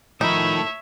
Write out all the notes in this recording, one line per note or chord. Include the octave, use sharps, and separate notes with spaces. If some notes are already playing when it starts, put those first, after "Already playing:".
A2 D#3 F3 D#4 C#5 E5 B5